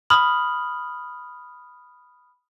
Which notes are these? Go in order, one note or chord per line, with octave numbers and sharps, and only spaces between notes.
B5 D#6 F6 F#7